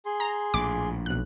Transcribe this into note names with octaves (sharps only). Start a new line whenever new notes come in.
G#4 C6
A#5
A#1 A2 D6
B1 F#6